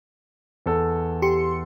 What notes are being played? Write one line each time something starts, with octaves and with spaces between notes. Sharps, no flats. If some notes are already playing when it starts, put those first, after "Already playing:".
E2 A4
G4 C6 C#7